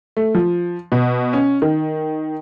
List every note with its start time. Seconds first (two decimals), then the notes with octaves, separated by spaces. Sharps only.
0.17 A3
0.35 F3
0.92 B2
1.33 C#4
1.62 D#3